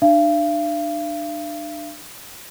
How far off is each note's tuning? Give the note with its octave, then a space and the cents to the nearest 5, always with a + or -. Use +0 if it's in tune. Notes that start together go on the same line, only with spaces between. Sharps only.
D4 +35 F5 -45